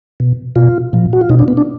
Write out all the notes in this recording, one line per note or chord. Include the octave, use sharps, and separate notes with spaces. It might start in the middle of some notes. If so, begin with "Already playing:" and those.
B2
B2 F4
A#2 F3
F#4
F4
B2 D#4
D4
B3
D4